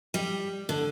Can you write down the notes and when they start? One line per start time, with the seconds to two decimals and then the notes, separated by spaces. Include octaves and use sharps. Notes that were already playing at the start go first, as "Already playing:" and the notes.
0.14 G3
0.69 D3